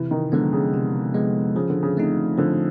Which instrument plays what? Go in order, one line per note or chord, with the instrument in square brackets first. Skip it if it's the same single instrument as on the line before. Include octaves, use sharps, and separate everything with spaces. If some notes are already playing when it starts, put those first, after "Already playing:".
Already playing: [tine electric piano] C3 [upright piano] E3
[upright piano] D#3
[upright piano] D3 [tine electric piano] F3 G#3 B3
[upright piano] C#3
[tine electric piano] C3
F3 G#3 B3
[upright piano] C#3 [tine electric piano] F3
[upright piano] D3
C#3
[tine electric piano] A3 C4 D#4
[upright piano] D3 [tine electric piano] F3